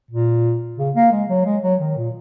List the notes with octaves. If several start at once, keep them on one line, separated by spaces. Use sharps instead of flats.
A#2
C#3
A#3
G#3
F#3
G#3
F#3
D#3
A#2